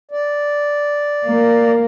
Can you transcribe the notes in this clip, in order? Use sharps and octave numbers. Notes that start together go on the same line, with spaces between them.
D5
A#3